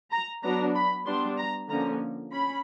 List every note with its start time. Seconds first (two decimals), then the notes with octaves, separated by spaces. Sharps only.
0.12 A#5
0.43 F#3 B3 D4 A#5
0.75 B5
1.06 G3 B3 D4 C6
1.38 A#5
1.69 D3 F3 A#3 C#4 A#5
2.32 C#4 B5